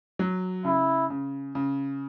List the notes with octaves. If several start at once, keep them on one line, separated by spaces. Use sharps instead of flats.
F#3
C#3 E4
C#3
C#3